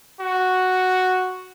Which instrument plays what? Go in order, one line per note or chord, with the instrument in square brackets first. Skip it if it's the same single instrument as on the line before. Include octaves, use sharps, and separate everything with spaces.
[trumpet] F#4